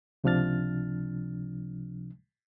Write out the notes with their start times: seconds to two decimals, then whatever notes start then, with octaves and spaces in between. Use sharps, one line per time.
0.24 C#2 C3 F3 D4 F6 A6